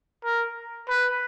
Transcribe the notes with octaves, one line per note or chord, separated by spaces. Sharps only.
A#4
B4